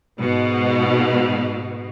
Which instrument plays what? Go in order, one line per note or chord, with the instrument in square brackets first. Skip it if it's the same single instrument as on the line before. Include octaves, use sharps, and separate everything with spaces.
[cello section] G#2 B2